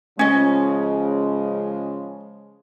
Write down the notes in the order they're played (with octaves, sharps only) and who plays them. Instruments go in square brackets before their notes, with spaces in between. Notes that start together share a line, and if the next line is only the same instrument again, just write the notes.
[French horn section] C#3 F3 G#3 [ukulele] C#4 D#5